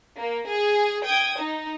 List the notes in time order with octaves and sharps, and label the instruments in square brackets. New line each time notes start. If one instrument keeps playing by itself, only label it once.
[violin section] A#3
G#4
G5 D#6 G#6
D#4